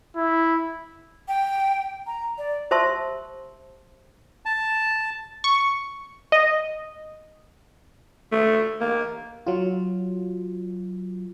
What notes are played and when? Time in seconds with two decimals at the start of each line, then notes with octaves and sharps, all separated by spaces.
0.16 E4
1.28 G5
2.07 A#5
2.38 D5
2.71 G4 C5 E5 A5 C6 E6
4.45 A5
5.44 C#6
6.32 D#5
8.32 A3
8.81 A#3
9.47 F#3 F4